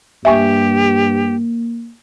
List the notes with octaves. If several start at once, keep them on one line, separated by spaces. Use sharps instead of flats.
G2 A#3 G4 E5 G#5 C#6